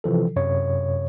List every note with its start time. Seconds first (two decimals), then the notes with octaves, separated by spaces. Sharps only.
0.04 C3 E3 F3 A4
0.36 F#2 C3 C#5